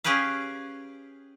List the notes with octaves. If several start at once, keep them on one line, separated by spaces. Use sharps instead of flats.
C#4 G4 G#4 B4 F5